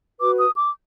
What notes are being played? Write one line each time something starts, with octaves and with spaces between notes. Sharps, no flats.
F#4 B4 D6
D#6
D6